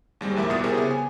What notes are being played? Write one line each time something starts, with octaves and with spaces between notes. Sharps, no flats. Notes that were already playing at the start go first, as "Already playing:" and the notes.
D#2 G3 G#3 C4
A#1 D#2 E4 A#4 E5 D6
C2 B2 B3 D#6 A6
E4 G4 G#4 A#4 C5 E5
C#3 B3
G#5